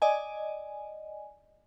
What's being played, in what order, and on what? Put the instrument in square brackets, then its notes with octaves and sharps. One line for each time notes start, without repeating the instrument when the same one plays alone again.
[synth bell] D5 D#5 G#5